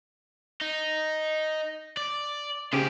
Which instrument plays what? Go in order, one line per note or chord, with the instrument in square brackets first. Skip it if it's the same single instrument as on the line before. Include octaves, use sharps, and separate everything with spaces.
[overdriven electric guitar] D#4
D5
[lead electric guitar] C#3 G4 [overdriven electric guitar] C5 G#5